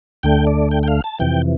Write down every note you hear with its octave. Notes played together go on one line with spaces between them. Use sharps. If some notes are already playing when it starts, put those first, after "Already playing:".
D2 D3 A3 G5
D5
G5
G5
F5
A5
F2 C3 E3 G5